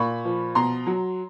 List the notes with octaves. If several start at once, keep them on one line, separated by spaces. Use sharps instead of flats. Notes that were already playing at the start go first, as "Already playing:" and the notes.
Already playing: A#2 B5 C#6
F3
B2 A#5 C6
F#3